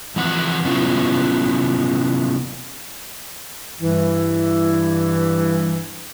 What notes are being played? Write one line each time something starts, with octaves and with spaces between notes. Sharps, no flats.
F2 E3 C4 F#5
C3 F#3 B3 C#4 E4 F4
G2 E3